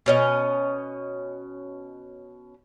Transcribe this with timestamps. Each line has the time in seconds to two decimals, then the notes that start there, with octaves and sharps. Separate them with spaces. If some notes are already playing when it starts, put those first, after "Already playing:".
0.06 B2 C#4 D#5